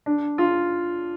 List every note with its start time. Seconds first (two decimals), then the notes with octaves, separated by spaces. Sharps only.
0.06 D4
0.38 F4